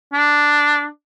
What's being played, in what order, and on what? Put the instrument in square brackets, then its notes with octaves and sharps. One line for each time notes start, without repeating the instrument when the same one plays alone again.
[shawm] D4